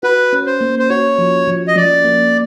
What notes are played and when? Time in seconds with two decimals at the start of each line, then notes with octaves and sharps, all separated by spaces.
0.03 F#4 B4
0.33 C#4
0.46 C5
0.61 A#3
0.79 C5
0.90 F#4 C#5
1.18 F3
1.48 F3
1.68 D#5
1.76 F3 D5
2.05 A#3